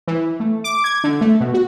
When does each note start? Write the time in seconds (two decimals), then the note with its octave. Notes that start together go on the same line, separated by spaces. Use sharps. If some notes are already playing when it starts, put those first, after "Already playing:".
0.08 E3
0.40 A3
0.64 D6
0.84 G#6
1.04 D3
1.21 A3
1.40 B2
1.54 F#4